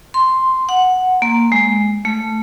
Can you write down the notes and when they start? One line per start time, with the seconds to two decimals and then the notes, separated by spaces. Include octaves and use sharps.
0.14 C6
0.69 F#5
1.22 A#3
1.52 G#3
2.05 A3